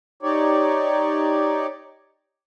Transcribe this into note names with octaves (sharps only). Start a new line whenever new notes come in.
D#4 G4 C#5 D5